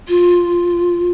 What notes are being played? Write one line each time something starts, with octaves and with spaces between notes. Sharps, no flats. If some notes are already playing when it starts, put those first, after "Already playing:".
F4